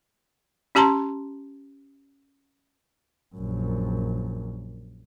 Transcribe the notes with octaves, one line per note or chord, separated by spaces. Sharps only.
C#4 G4 A5 A#5 C6
A#1 F#2